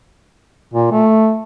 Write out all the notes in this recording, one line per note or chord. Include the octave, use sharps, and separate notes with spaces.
A#2
A3